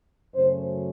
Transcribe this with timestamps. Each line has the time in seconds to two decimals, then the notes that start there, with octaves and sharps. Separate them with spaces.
0.35 F#2 C#3 F#3 A3 C#4 C5